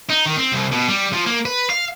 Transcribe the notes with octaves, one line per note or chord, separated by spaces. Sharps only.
D#4
D#3
C4
C2
B2
G3
F3
A#3
B4
F5